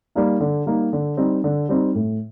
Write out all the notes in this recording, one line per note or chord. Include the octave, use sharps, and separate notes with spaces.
G3 A#3 D#4
D3
G3 A#3 D#4
D3
G3 C4 D#4
D3
G3 C4 D#4
A2